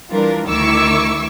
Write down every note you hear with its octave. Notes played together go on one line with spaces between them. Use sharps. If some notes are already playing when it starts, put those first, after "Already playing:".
E3 G3 D4 F4 A#4
D2 D#3 E4 C#6 D6 E6